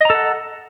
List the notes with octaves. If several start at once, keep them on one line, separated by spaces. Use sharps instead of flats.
A4 D#5 F#5 A#5